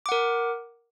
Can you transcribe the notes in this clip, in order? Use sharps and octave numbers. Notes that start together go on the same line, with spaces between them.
A#4 F#5 D6